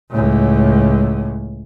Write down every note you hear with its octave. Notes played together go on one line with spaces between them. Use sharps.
C#2 A2